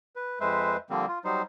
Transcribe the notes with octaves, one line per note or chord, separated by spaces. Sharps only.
B4
F2 G#3 B4 C5 E5
D3 F3 G3 A#3 C4
F4
F#3 G3 D#4 C5